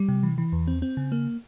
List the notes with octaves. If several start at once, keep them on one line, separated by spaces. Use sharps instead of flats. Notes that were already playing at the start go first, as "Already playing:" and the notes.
Already playing: G3
C3
E3
E3
E2
C4
C4
C#3
A#3